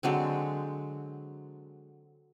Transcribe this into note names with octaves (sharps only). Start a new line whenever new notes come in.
D3 F#3 G#3 C4